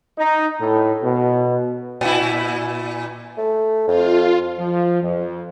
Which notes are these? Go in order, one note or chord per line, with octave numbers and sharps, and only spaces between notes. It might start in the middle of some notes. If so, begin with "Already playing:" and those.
D#4
A2
B2
A#2 E4
A3
F2 F4
F3
F2